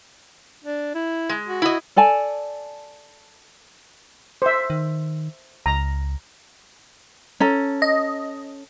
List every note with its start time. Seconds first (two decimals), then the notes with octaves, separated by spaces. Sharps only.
0.64 D4
0.95 E4
1.29 G#3
1.47 F#4
1.62 E4 D#5
1.96 A4 D5 G#5 A5
4.42 C5 E5
4.70 D#3
5.66 C#2 A#5
7.40 C#4 A4 A#5
7.82 D#5